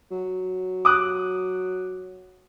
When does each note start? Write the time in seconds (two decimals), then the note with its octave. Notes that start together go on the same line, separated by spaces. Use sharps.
0.11 F#3
0.85 D6 D#6 F#6